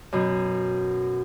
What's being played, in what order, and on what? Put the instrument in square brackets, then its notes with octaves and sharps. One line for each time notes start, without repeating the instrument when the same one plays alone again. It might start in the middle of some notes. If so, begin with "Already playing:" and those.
[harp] F#2 B2